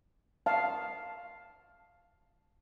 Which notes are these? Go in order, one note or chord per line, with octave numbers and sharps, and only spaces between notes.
F5 A5